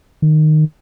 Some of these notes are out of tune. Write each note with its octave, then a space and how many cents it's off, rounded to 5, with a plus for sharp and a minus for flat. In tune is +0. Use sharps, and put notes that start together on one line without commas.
D#3 -15